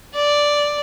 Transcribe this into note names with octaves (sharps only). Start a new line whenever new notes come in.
D5